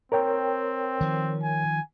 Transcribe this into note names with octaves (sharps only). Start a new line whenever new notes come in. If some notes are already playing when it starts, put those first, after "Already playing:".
C4 A#4 C#5 G5
D#3 F3
G#5